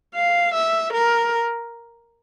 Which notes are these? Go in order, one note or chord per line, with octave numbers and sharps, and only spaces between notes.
F5
E5
A#4